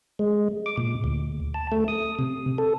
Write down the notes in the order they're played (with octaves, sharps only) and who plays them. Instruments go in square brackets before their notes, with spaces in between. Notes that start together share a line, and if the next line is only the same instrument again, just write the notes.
[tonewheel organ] G#3
D6
A#2
D2
A5
A3
D#6
C3
A4